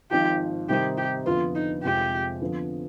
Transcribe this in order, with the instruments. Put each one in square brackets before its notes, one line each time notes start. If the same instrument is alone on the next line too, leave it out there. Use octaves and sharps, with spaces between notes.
[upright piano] G#1 G#2 F3 [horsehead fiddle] G4
[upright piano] C3 D#3 G3 C4 D#4 [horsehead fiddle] G4
[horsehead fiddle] G4
[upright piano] F2 D3 F3 B3 [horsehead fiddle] F4
[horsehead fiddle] D#4
[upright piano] F1 F2 C3 F3 G#3 [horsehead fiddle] G4
[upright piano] F2 D3 F3 B3